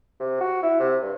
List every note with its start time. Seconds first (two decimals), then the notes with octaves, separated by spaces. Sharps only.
0.20 C3
0.40 F#4
0.63 E4
0.79 C3
1.02 G2